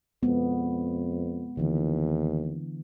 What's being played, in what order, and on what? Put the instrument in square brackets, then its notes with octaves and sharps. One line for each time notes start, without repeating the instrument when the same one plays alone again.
[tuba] F2 [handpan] G#3 B3
[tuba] D#2 [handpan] D3 E3